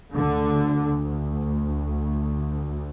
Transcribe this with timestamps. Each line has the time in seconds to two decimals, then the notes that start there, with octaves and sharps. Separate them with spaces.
0.15 D2 D3